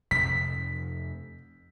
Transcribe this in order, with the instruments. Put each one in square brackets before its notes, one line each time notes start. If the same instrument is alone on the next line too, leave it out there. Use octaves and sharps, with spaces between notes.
[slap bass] F2 C3 A3 [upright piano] B6